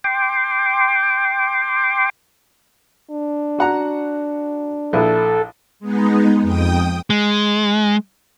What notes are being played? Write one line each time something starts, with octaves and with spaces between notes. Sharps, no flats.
G5 C6 D6
D4
F#4 F#5 A#5
A#1 E4 A4 B4
G#3 B3 D#4
F2 G5 D#6
G#3